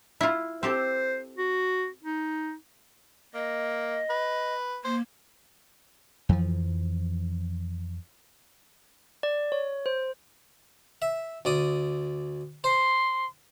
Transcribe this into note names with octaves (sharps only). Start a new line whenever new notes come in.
E4 F4
C4 G4 A4 C5
F#4
D#4
A#3 D#5
B4
A#3 C5
F2 E3 F3
D5
C#5
C5
E5
D2 D5 D#6
C5 C6